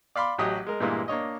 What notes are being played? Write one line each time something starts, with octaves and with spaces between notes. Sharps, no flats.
D5 F5 B5 C6 D6
A1 F#3 G4 D#5 D#6
G#3 A#4
G2 A#2 E3 G#3 A#3 E4
A#3 D4 C#5 D#5